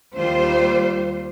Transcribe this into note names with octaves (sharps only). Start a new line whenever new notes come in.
D#2 G3 F4 C5